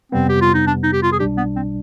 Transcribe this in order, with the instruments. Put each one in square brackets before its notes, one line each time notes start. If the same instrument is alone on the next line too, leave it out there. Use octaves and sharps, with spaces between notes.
[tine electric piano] F2 C3 G3 B3 [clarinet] C4
[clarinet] G4
F4
D#4
D4
D#4
G4
F4
G#4
[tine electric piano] B1 B2 G3 D4 [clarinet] G4
[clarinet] B3
C4